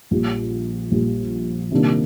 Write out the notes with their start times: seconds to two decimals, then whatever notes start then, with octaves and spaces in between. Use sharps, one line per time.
0.11 A#1 A#2 G3
0.91 A#1 A#2 G3
1.71 C3 D#3 G3 A#3 D4